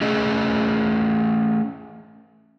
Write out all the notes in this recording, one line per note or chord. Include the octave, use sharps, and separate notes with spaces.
A3 C#4 G#4 D#5